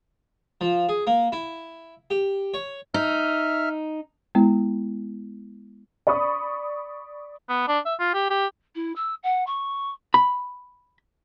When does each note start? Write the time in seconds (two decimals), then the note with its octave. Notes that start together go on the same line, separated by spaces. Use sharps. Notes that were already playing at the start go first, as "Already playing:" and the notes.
0.61 F3
0.89 G#4
1.07 A#3
1.32 E4
2.10 G4
2.54 C#5
2.94 D#4 E5 F6
4.35 G#3 B3 E4
6.07 D5 B5 C#6 D#6
7.49 B3
7.68 D4
7.85 E5
8.00 F4
8.14 G4
8.30 G4
8.76 E4
8.96 E6
9.23 F#5
9.47 C#6
10.14 B5